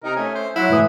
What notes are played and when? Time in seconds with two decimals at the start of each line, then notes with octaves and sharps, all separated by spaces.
0.03 C3 D#4 A#4
0.16 A3 C#4 G#5
0.35 C5
0.56 F#3 E4 F#5
0.69 A2 E3 G#3 D#6